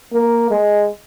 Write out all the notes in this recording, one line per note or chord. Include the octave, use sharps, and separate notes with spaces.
A#3
G#3